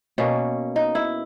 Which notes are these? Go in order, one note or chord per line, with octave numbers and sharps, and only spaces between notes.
B2 A#3 C#4
D#4
E4